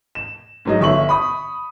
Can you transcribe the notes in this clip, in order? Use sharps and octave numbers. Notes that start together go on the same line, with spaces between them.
E7
G#2 F#3 D#5
G1 E5 C#6 F#7
B5 C#6 D#6